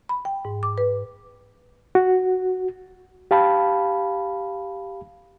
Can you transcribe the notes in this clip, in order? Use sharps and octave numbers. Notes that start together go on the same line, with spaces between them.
B5
G5
G#2
D6
B4
F#4
G4 F5 A5 B5